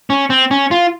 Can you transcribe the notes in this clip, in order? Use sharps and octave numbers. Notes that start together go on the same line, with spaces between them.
C#4
C4
C#4
F4